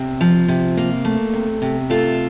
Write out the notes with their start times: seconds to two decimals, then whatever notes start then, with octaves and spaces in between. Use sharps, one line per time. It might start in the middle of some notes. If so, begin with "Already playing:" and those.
Already playing: C3
0.21 F3
0.48 C3
0.77 A#3
1.05 A3
1.33 C3
1.62 C3
1.90 A3 F4 A4